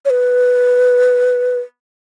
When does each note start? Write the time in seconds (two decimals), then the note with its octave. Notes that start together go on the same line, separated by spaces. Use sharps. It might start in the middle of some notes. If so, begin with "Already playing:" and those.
0.05 C#5
0.10 B4